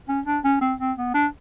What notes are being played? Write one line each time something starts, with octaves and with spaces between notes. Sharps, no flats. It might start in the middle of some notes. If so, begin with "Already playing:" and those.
C#4
D4
C#4
C4
C4
B3
D4